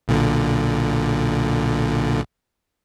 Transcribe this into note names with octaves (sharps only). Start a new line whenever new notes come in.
B1 A#2 D3